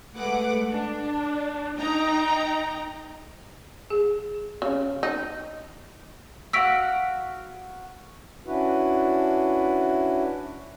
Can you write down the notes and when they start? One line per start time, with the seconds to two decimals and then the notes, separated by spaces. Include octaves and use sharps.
0.14 G#3 A3 B4 F#5 D6
0.71 D4
1.77 D#4 G5 A#5
3.90 G#4
4.62 C#3
5.03 D#4
6.53 F#4 F5 F#5 E6 B6 D7
8.46 C#4 D4 E4 F#4 B4